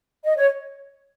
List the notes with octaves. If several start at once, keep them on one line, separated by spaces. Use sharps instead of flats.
D#5
C#5